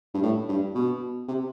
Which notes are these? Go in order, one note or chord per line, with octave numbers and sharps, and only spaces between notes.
G2
A2
G2
B2
C3